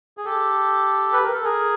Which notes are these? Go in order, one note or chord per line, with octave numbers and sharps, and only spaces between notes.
G#4
G4 A4
B4
A#4
A4
G#4 A#4